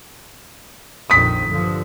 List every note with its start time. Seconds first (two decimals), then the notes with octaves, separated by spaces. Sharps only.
1.10 A#1 F2 D#3 D#6 B6
1.48 G2 D3 F3